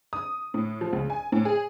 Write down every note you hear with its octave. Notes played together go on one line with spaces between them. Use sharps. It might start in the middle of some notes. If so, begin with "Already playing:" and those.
D#6
A2
F3
C#2
G#5
A2
G#4